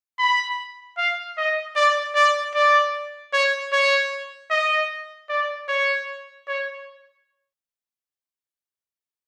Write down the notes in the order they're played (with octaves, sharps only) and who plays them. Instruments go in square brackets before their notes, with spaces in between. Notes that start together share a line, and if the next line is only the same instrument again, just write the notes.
[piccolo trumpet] B5
F5
D#5
D5
D5
D5
C#5
C#5
D#5
D5
C#5
C#5